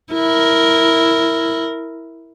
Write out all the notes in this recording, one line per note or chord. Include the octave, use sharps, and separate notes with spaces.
E4 A#4